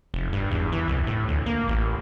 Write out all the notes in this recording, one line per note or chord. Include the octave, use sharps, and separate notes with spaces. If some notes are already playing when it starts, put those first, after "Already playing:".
F1
G2
E2
E3
C2
A2
D2
A#3
A1